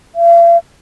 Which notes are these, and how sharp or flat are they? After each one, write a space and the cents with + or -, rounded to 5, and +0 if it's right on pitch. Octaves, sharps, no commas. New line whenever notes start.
F5 -45